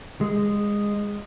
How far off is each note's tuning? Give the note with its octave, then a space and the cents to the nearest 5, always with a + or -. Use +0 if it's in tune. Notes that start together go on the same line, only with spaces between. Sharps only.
G#3 -15